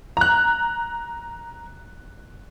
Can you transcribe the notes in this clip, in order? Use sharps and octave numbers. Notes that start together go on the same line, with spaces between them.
A#5 F#6